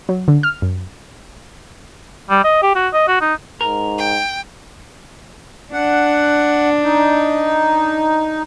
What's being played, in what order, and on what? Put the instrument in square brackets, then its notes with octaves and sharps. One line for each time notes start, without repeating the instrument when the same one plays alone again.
[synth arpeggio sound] F#3
D3
F6
F#2
[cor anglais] G3
D#5
G4
F#4
D#5
F#4
D#4
[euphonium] G#2 [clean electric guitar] A#4
[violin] G5
[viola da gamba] D4 [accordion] F#5
[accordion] D#4